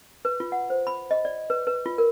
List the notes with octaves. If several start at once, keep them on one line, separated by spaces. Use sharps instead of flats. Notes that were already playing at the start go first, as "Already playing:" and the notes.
B4
F4
F#5
C5
B5
D#5
D5
B4
B4
F4
A#4